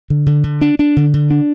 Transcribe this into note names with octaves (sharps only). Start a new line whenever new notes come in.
D3
D3
D3
D4
D4
D3
D3
D4